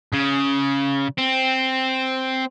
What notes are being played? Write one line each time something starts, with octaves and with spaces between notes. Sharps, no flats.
C#3
C4